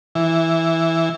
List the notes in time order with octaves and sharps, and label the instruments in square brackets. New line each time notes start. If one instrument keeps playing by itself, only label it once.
[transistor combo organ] E3